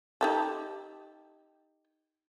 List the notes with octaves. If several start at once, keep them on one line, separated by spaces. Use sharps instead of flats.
D#4 G4 A4